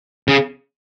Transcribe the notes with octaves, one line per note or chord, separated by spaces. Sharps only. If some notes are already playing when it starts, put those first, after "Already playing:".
C#3